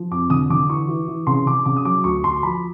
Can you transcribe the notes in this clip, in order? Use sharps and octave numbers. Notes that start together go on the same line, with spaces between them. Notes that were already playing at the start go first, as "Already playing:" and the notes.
Already playing: F3
F2 D6
D3 D#6
D3 D6
E3 C#6
E3
E3
C#3 C6
C#3 D6
C#3 D6
D#6
F#3 D6
D2 C#6
D2 C6
F3 B5